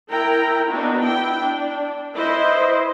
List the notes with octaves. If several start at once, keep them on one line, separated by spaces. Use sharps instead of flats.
E4 A#4 G5 A#5
B3 D4 D#4 F#4
E4 G5
D4
E4 B4 C5 D#5